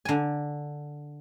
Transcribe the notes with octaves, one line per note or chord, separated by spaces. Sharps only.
D3 G#5